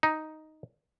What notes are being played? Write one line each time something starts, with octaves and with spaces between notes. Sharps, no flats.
D#4